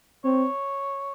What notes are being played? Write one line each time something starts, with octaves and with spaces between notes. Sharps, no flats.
C4 C#5